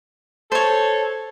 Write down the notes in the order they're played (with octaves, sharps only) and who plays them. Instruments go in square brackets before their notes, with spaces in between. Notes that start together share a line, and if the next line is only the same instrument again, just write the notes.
[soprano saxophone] A4 [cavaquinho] C5 C#5